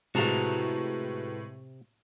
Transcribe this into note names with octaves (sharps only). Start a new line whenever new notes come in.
A2 C3 G#3 E4 F#4 B4 A5 A#5